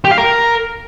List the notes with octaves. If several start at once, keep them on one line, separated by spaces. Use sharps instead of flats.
G4
F5
A#4